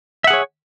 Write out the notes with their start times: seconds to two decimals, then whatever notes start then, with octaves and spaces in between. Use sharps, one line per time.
0.24 E5
0.27 F#5
0.30 G#4
0.33 C#5